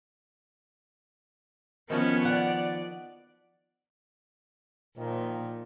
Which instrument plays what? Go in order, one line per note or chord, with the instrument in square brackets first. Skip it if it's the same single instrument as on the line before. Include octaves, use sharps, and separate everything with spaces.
[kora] D#3 F3 F#4 [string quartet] B3 [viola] C#4
[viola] D5 [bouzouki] F#5
[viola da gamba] A#2 [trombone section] D#3 F3